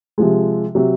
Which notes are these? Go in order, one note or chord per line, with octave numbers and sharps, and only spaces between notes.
C3 F3 G#3
C3 F#3